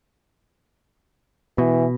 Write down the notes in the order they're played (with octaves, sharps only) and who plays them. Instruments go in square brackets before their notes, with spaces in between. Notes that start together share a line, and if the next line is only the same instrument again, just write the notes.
[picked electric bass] B2 [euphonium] E3